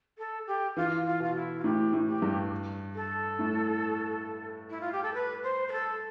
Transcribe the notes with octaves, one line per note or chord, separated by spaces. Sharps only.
A4
G4
E3 F4
F4
B2 F4
E4
F4
A2 G4
A2
G4
G2
A4
A2
E4
F4
G4
A4
B4
C5
B4
A4